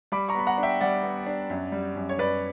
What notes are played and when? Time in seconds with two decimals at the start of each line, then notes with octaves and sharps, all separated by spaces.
0.12 G3 B5 D6
0.29 A#5 C#6
0.35 B3 B5
0.47 F#5 A#5
0.58 D4
0.63 E5 G5
0.81 G3 D5 F#5
1.03 B3
1.27 D4
1.50 F#2
1.72 G3
1.96 F#2
2.09 C#5
2.18 F#2 B4 D5